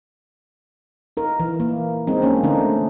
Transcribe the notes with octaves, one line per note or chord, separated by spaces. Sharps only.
D#4 A#4
E3
A#3
G#3 C4 D#4
A#3 C#4 D4
D3 A3 D4 D#4